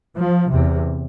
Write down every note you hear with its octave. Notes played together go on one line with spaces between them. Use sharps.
F3
E2 C3